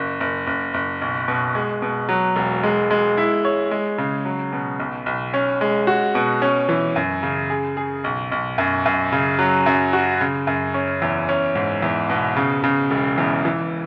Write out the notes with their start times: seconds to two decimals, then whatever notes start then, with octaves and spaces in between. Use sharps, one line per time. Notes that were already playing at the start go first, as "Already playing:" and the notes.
Already playing: F#1
0.20 F#1
0.47 F#1
0.74 F#1
1.02 B1
1.28 B2
1.55 G#3
1.82 B2
2.09 F#3
2.36 E1
2.63 G#3
2.91 G#3
3.17 E4
3.45 C#5
3.71 G#3
3.98 C#3
4.25 F#3
4.53 B2
4.80 B1
5.06 B1
5.34 C#4
5.61 G#3
5.87 F#4
6.15 B2
6.42 C#4
6.69 E3
6.96 F#2
7.23 C#3
7.50 G#4
7.77 G#4
8.04 B1
8.32 B1
8.58 F#2
8.86 F#2
9.13 C#3
9.39 F#3
9.66 F#2
9.93 F#4
10.21 C#3
10.47 F#2
10.74 C#4
11.02 E2
11.29 C#4
11.55 G#2
11.82 E2
12.10 B2
12.37 C#3
12.64 C#3
12.91 E1
13.18 E2
13.45 E3